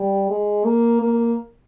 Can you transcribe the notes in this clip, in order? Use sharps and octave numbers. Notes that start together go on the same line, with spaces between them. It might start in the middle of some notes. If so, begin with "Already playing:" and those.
Already playing: G3
G#3
A#3
A#3